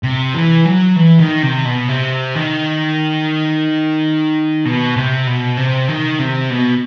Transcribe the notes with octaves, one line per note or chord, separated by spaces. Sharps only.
C3
E3
F#3
E3
D#3
C3
B2
C3
D#3
B2
C3
B2
C3
D#3
C3
B2